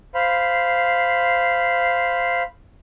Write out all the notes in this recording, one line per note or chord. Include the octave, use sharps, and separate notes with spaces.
C5 F5 B5